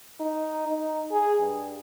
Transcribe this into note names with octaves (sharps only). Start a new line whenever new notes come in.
D#4
D#4
G#4
G2